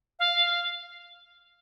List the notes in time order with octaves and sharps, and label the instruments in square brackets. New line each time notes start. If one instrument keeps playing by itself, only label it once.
[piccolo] F5